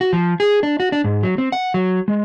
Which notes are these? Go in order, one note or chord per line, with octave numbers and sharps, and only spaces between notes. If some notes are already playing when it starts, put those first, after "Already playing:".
F#4
F3
G#4
D4
F#4
D4
G#2
F#3
C4
F#5
F#3
G#3